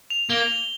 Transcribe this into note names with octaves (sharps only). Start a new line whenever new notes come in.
F7
A#3 G7